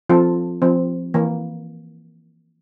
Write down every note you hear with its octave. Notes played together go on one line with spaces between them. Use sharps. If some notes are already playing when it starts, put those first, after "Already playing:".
F3 C4 F4 A4
F3 C4
E3 A#3